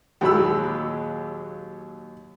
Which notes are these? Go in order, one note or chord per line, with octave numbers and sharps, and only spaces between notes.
D#2 A#2 F#3 G#3 B5 E6